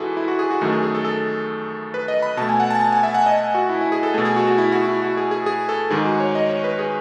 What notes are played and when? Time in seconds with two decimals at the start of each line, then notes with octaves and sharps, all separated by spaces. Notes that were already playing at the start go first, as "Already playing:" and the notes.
Already playing: G#2 E3 E4 F#4 G#4 A4
0.17 E4
0.28 F#4
0.39 G#4
0.51 F#4
0.61 F#2 D#3 A3 F#4
0.73 G#4
0.83 G#4
0.94 A4
1.05 A4
1.94 B4
2.08 D#5
2.22 B5
2.37 B2 A5
2.41 A3
2.49 G#5
2.60 F#5
2.70 A5
2.81 A5
2.92 G#5
3.03 E5
3.14 F#5
3.26 D#5
3.55 F#4
3.69 E4
3.81 E4
3.92 G#4
4.03 A4
4.14 B2 A3 G#4
4.25 G#4
4.36 F#4
4.47 F#4
4.58 E4
4.72 F#4
4.88 E4
5.02 F#4
5.17 G#4
5.31 G#4
5.46 G#4
5.69 A4
5.90 G#2 D#3 G#3 G#4
6.05 F#4
6.20 C#5
6.35 D#5
6.49 C#5
6.64 B4
6.79 G#4